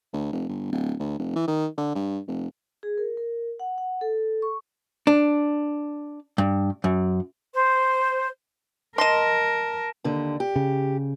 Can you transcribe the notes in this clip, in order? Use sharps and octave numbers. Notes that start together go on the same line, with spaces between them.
D2
F1
G1
D1
D2
F1
E3
D#3
D3
G2
F1
G#4
A#4
A#4
F#5
F#5
A4
C#6
D4
G2
F#2
C5
A#4 D#5 A5 C6 A#6 E7
D#2 D3
G4
C#3